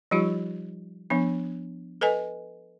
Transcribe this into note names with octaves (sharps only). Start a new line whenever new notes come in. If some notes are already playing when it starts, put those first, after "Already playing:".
F3 G3 D#4 F4 G4
F3 B3 D4
A4 B4 D#5 G#5